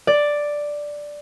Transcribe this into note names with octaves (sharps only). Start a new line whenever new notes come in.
D5